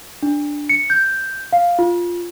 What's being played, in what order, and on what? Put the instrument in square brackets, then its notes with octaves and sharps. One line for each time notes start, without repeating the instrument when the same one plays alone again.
[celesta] D4
C#7
G6
F5
F4